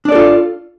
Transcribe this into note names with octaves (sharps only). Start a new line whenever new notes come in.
D4 F4 A4 D5